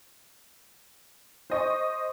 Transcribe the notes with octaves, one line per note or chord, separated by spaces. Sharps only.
C5 D#5 C#6